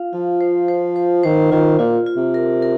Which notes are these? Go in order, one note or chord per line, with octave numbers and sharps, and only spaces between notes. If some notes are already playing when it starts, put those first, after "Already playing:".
Already playing: F4 F5
F3 F4
C5
C5
C5
D#3 C5
D#3 F4
A#2 F4
F4
C3
A#4
A#4